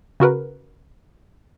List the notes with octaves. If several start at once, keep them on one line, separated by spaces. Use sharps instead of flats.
C#3 F#4 A#4 B4